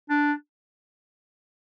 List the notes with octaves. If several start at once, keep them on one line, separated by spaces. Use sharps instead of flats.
D4